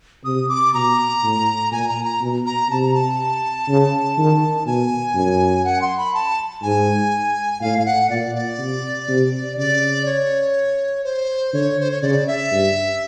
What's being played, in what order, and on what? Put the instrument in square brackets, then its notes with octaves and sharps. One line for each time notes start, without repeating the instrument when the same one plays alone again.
[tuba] C3 [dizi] D#6
[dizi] D6
[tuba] B2 [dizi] A#5
[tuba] A2
[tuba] A#2 [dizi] G#5
[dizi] A#5
A#5
[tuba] B2
[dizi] A#5
[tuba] C3 [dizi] A5
[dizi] A#5
A5
[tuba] C#3
D#3
[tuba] B2 [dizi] G#5
[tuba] F#2
[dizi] F#5
C6
B5
A5
[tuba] G#2 [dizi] G#5
[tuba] A2 [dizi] F5
[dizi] F5
F#5
[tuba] A#2 [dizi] D5
[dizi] D5
[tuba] C3
C3
[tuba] C#3 [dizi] D5
[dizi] C#5
C5
[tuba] D3 [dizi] C#5
[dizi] C5
C#5
[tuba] C#3 [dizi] D5
[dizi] E5
[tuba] G2